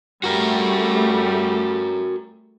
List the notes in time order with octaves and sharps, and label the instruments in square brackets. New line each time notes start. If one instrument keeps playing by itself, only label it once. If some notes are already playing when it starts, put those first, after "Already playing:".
[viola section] G3 A3 [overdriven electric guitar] F#4 A#4